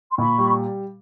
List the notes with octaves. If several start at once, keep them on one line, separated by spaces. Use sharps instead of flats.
C6
A#2 B5 C#6
G3